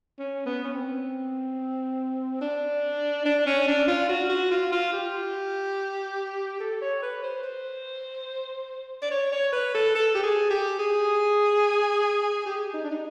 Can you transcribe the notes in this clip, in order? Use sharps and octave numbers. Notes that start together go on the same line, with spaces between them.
C#4
B3
C#4
C4
D4
D4
C#4
D4
F4
F#4
F#4
F4
F4
G4
A4
C#5
B4
C5
C5
D5
C#5
C#5
B4
A4
A4
G4
G#4
G4
G#4
G4
D#4
D4
D#4